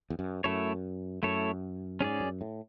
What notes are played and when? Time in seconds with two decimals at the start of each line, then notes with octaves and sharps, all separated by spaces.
0.10 E2
0.19 F#2
0.44 F#2 A3 E4 A4 C#5
1.23 F#2 A3 E4 A4 C#5
2.01 G#2 C#4 G#4 D5
2.20 F#2
2.41 A2